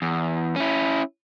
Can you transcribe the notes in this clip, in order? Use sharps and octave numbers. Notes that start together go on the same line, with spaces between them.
E2
C#4 E4